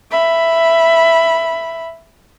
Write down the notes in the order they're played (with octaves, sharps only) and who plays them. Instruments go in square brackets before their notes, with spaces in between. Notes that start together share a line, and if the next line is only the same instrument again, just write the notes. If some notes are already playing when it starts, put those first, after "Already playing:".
[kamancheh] E5 B5